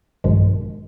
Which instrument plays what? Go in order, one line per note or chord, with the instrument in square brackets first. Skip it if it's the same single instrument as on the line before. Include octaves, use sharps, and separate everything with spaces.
[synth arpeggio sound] A#1 G2 B2 D#3 F3 G#3